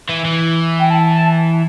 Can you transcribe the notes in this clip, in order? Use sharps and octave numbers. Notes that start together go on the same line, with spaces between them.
E3
E3
G5
A5